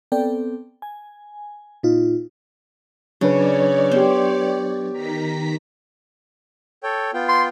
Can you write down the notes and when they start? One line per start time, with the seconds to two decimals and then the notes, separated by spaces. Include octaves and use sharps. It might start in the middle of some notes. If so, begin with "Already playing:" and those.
0.12 B3 C4 A4 D5 G5
0.82 G#5
1.83 A#2 D#4 F4
3.21 C#3 F#3 D4 B4 C#5 D5
3.92 B3 G4 C5
4.92 D#3 A#5 B6
6.83 A4 C#5 G5
7.14 B3 F4 G5
7.28 C6